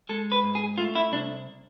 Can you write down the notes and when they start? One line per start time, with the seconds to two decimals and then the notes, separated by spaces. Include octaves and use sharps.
0.09 G#3 A4
0.32 B4
0.43 G#2
0.55 G#4
0.78 A3 F4
0.95 E4
1.12 C2 D4